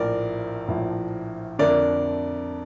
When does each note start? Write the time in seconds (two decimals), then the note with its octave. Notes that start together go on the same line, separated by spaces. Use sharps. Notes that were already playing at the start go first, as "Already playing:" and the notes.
Already playing: A#1 A2 F3 A#4 D5
0.68 A#1 A2 F3
1.59 F2 D3 A3 D4 A#4 D5